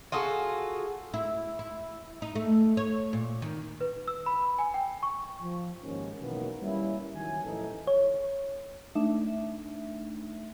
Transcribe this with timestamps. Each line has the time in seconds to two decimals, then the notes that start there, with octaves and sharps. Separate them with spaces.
0.12 F4 F#4 G#4 A4
1.14 E4
1.59 E4
2.22 D#4
2.35 A3
2.77 C#5
3.13 A#2
3.42 D#3
3.81 B4
4.08 E6
4.26 B5
4.59 G#5
4.74 G5
5.03 C#6
5.40 F3
5.82 D#2 G#2 C#4
6.22 B2 D#3 E3 F#3 A#3 B3
6.62 G3 A#3 C#4 E4
7.15 D#3 E3 F#3 G#5
7.45 A1 E3 F3 D#4 A4
7.87 C#5
8.95 A3 D4 D#4 E5